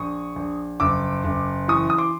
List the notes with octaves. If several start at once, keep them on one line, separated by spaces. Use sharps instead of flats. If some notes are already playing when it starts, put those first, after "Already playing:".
Already playing: A#1 C#6 D#6
A#1
F#1 D6 E6
F#1
E3 C#6 D#6
D#6
C6 D6